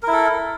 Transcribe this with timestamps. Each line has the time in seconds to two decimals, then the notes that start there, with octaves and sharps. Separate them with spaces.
0.03 A#4
0.08 E4
0.12 A4